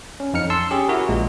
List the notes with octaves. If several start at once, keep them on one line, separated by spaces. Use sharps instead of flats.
C#4
F2 D#4 F6 C#7
A5 C6 E6
C#4 G4 G#4
E4 F#4 A#4
A#1 A#2 G#3